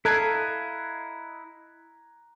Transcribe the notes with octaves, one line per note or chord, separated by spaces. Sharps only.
E4 A4 D#5 F5 A#5 F#6 G#6